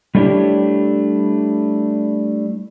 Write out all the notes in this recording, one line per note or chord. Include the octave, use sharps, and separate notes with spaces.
G3 A3 D4 E4 G4 C#5